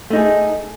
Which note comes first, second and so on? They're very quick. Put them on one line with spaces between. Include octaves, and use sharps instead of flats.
A3 D#4 G#4